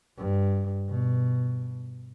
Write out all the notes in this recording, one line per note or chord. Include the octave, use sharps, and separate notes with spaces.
G2
B2